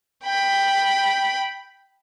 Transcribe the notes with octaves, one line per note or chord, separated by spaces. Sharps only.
G5 B5